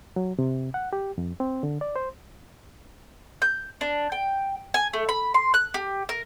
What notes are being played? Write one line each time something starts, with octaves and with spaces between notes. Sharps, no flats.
F#3
C3
F#5
G4
F2
C4
D3
D5
C5
G6
D4
G5
G#5
A3
B5
C6
F#6
G4
A#4